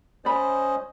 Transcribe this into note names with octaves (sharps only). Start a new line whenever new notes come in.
C#4 C5 D5 D#5 B5